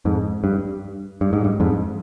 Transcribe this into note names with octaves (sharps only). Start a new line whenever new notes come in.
F2 G#2
G2
G2
G#2
G2
F2 G#2